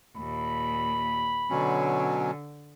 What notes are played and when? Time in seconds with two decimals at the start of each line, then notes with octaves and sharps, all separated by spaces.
0.18 D#2 A#2 B5
1.50 B2 D3 F#3 C#4